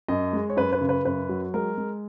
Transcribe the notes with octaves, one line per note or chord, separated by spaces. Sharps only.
F#2 D#5
G#3
C#5
F#2 B4
B4
C#3
B4
F#2 B4
F#3
G#3 A#4
G#3